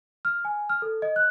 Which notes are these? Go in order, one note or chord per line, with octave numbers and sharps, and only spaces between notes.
F6
G#5
F6
A4
D#5
F#6